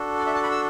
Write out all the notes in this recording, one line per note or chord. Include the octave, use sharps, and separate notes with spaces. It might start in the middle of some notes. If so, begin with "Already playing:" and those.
Already playing: D4 F#4 A4
D5
E5
A5
B5
E6